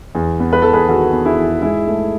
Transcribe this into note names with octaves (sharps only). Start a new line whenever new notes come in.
E2
B3
B4
E2 A4
G#4 B4
D#3 F#4 A4
B3
E4 G#4
E2
G#2 E4 G#4
A3